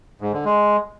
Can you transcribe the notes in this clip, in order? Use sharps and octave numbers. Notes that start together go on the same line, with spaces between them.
G#2
D3
G#3